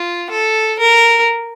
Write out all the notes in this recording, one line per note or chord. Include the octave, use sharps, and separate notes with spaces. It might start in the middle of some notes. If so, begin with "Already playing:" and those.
Already playing: F4
A4
A#4